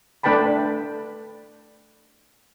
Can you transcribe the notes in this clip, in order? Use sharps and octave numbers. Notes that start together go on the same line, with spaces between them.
A3 D4 B4 G5 A5 B5